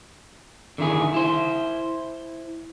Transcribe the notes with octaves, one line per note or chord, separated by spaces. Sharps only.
D3 D#3 E4 G#4
E4 C5